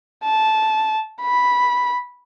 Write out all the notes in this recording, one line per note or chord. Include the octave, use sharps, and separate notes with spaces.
A5
B5